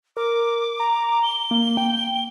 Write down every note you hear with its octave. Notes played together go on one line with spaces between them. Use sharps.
A#4 D6
A#5
G7
A#3
G5